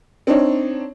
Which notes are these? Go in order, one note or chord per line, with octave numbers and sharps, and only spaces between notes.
C4 D4 D#4 C#5